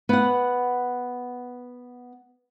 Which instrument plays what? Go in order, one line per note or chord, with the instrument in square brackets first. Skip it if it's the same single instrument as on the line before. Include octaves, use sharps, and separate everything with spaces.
[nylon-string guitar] B3 F#5